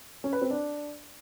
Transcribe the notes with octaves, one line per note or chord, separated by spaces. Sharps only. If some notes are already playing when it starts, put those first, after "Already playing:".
C#4
B4
C4
D4